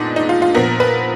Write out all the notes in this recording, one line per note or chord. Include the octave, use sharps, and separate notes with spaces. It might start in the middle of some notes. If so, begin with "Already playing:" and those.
Already playing: A#2 G#3 B3 D4 D#4
D#4
F4
F4
A#2 F3 B3 A#4
B4